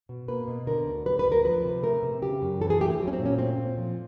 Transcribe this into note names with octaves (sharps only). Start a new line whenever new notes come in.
B2
A#3 B4
B2
D3 A#4
D2
G3 B4
B4
D2
A#4
F3 B4
C3
A3 A#4
C3
C#3 G4
F#2
E3 A4
G#4
A3 G4
G#4
F#3
C#4
C4
A#2
C#4
A3 C4
A#2
F3